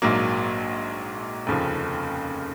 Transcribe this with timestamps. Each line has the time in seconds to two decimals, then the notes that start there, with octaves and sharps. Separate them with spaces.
0.02 A#1 G#2 F#3 A#3
1.47 F1 D#2 C#3 F3